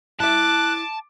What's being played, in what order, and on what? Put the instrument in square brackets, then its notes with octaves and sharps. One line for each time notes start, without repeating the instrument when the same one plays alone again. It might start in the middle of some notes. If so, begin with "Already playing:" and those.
[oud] E4 E5 [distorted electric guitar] A5 [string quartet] D6 A6 [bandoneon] F#6